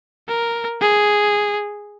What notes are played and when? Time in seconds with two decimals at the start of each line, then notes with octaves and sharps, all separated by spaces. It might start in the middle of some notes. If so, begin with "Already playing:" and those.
0.29 A#4
0.81 G#4